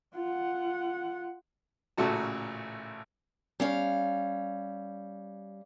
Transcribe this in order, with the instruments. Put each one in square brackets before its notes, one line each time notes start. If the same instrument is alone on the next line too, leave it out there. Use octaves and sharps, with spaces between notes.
[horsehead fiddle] F4 F#5
[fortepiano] A1 A#2 C#3 A3 F#4 A5
[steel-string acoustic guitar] G3 C#4 F5